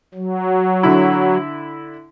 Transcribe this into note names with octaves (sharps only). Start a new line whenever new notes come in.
F#3
D3 E4